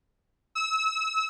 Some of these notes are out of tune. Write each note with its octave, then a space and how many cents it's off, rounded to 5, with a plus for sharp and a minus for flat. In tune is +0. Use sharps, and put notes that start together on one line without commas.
E6 -30